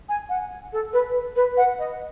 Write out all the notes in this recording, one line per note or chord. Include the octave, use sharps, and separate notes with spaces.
G#5
F#5
A4
B4
B4
F#5
D#5